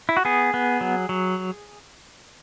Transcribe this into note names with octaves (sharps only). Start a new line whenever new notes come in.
E4
F#4
B3 G#4
B3
F#3
F#3